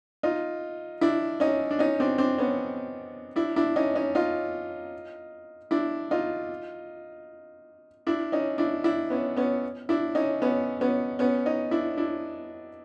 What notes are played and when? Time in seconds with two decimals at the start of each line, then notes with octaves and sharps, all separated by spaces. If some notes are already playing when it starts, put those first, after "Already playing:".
0.23 D#4 F4
1.01 D4 E4
1.40 C#4 D#4
1.71 D4
1.79 C#4 D#4
2.00 C4 D4
2.18 C4 D4
2.38 B3 C#4
3.36 D4 E4
3.56 D4 E4
3.76 C#4 D#4
3.95 C#4 D#4
4.15 D#4 F4
5.71 D4 E4
6.11 D#4 F4
8.07 D4 E4
8.32 C#4 D#4
8.58 D4 E4
8.84 D4 E4
9.10 B3 C#4
9.37 B3 C#4
9.89 D4 E4
10.15 C#4 D#4
10.42 B3 C#4
10.81 B3 C#4
11.19 B3 C#4
11.46 C#4 D#4
11.71 D4 E4
11.97 D4 E4